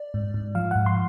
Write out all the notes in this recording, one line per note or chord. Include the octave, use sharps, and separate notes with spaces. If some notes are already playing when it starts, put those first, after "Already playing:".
Already playing: D5
G#2
G#2
F3 F5
G#2 F#5
C6